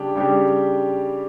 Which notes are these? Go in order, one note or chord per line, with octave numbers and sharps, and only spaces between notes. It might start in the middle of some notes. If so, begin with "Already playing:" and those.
Already playing: C#3 G3 D4 G4
C#3 G3 D4 G4